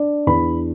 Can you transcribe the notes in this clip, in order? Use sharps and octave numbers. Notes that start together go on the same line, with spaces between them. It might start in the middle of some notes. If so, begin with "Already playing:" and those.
Already playing: D4 D5
E2 B5